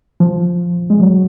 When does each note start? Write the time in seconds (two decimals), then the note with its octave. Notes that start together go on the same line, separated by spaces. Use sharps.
0.20 F3
0.90 G#3
1.00 F#3